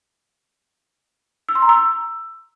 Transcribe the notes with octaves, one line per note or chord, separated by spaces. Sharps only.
E6
C6
A#5
E6